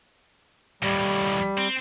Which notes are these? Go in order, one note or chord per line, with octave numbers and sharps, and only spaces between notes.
D#2 A2 G3
C4